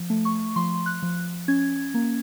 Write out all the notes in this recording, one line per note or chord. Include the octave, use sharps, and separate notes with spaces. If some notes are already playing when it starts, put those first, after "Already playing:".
Already playing: F3
A3
C#6
F3 C6
F#6
F3
C#4 G#6
A#3